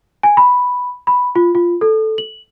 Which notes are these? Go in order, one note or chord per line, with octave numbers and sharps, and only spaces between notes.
G#5
B5
B5
F4
F4
A4
F#7